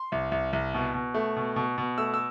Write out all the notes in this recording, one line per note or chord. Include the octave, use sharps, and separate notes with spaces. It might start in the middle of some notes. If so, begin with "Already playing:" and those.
Already playing: C6
C2
C2
C2
B2
B2
A3
B2
B2
B2
A3 E6
E6